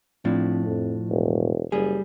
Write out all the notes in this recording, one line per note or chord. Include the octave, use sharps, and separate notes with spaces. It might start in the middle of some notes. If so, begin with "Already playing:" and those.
A2 F3 C4 D4
F2
E1
F#1 G3 G#4